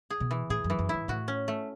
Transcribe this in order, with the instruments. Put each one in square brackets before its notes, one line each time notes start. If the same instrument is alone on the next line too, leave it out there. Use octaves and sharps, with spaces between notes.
[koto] G#4
[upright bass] B2
[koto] E3
[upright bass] A2 [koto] G#4
[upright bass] F#2
[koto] E3
[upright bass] F#2
[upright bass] G#2 [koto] E4
[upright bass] A2 [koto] F#4
[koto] C#4
A3